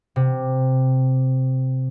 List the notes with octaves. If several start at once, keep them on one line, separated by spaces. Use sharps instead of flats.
C3